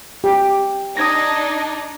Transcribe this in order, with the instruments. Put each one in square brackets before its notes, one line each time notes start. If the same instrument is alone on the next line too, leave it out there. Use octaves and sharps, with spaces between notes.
[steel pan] G4
[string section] D4 D#4 [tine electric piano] D#6 G#6 A#6